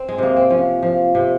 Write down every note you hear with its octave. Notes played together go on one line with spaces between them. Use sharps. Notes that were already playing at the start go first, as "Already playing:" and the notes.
Already playing: C4
G#3
C3 A#3
C4
F3 C#4
F3
C3